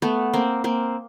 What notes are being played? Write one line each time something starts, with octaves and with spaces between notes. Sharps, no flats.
A3 B3
A#3 C4
A#3 C4